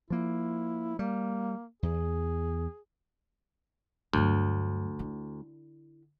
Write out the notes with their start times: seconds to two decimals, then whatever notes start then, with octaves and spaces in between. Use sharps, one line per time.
0.10 F3 A#3 E4
0.99 G3 A#3
1.83 E2 G#4
4.13 D2 G2 F#3
4.99 D3 E4